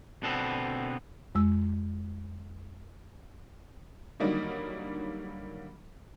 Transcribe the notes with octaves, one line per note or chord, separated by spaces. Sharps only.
B2 D3 B3 C4 A4
F2 G#3 E6
D3 D#3 F#3 G3 A#3 D#4